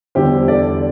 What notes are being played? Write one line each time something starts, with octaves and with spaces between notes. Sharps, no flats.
E2 D3 G3 G4 C5
A4 D5